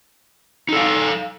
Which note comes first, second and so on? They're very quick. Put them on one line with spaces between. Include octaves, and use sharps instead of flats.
D#4 A4 F5